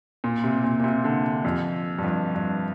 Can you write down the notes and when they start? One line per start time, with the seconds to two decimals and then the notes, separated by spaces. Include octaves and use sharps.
0.24 A#2
0.44 C3
0.64 A#2
0.80 A#2
0.84 C3
1.04 D3
1.44 F2
1.98 G2
2.04 F2
2.35 G2